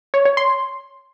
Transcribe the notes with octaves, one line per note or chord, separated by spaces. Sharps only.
C#5
C#5
C6